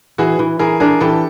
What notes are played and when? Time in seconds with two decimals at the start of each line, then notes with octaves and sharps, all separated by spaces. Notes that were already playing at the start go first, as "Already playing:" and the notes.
0.18 E3 F#4 G#4
0.39 E3
0.59 E3 G#4 A#4
0.80 D4 G#4 A#4
1.00 E3 G4 A4